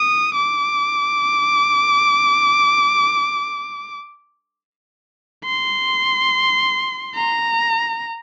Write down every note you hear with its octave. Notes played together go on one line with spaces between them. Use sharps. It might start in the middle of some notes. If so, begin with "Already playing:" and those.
Already playing: D#6
D6
C6
A#5